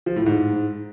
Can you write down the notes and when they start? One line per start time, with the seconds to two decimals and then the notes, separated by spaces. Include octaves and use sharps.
0.06 F3
0.16 A2
0.26 G#2